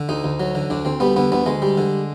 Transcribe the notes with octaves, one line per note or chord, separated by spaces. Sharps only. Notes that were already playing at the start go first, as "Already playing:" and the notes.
Already playing: D3
D2 D#4
D2
F#3
D3
D2 D4
D2 C4
G3 B3
D3 B3
D2 B3
D2 G#3
G3
D3